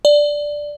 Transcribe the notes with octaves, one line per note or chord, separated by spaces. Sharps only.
D5